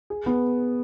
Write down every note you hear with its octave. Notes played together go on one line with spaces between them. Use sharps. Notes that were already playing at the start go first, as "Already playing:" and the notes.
G#4
B3